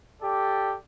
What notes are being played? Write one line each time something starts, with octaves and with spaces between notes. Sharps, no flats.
G4 A4 D5